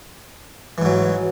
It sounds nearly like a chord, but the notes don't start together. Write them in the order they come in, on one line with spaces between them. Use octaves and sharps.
E3 G#2 F#3